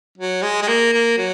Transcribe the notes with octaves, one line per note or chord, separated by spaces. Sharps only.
F#3
G#3
G#3
A#3
A#3
F#3